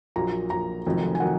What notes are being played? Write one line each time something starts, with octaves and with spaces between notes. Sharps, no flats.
A#1 A#2 F#3 A#5
A#1 A#2 F#3 A#5
F1 F2 D#3 F#3
G#5
D#3 F#3 F#5